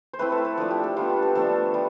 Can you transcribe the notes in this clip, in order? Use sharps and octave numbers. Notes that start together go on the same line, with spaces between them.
C5
A3 C4 E4 B4
A4
B4
F3 A3 D4 A4
G4
A4
G3 B3 D4 F4
G4
A4
F3 A3 D4 A4
G3